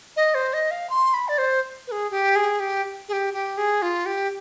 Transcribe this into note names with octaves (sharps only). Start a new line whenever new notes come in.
D#5
C5
D#5
F5
C6
B5
D5
C5
B4
G#4
G4
G#4
G4
G#4
G4
G4
G#4
F4
G4